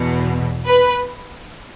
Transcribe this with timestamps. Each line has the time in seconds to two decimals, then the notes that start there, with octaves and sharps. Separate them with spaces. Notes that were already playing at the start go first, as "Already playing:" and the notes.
Already playing: E2 B2
0.67 B4